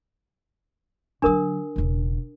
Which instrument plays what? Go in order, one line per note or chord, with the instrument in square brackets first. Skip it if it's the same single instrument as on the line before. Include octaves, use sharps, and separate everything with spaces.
[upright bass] D3 F#3 [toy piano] D4 A#4 D#6
[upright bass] E1 C#3